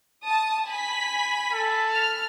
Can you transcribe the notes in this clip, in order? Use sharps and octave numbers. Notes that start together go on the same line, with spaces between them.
A5 D#6
G#5 B5 B6
A4
F6